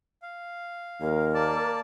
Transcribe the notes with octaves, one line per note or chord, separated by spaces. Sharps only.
F5
D#2 A#4
A#3 D5 A5